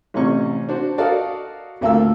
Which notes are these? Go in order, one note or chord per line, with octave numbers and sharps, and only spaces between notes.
A1 C3 C#4 C#6
D4 F#4 C5
F#4 A4 A#4 D5 D#5 F5
D2 A3 A#3 F4 A#4 E6